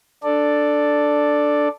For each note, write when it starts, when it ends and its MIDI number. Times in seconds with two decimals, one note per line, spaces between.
0.23 1.68 62
0.23 1.68 69
0.23 1.68 74